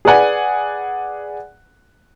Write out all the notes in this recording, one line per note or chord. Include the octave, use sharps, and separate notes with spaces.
G#4 B4 D5 F#5 G#5